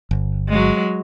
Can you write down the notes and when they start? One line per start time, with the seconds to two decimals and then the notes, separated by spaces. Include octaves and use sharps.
0.11 G1
0.48 F#3 G#3